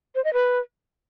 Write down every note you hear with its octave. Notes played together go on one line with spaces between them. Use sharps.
C5
D#5
B4